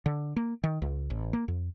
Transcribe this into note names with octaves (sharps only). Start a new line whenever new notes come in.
D3
A#3
D#3
C#2
A1
A#3
F2